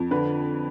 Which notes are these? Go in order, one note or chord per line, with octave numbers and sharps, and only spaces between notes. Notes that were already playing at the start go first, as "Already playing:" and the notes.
Already playing: F2
D3 B4